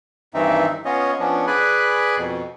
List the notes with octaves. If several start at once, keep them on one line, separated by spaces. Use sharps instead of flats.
G2 D#3 E3 C4 D#4 E5
B3 C#4 F4 C#5 D#5
F3 B3 C#4 D4
G#4 B4 D5 G#5 B5 F#6
F2 B2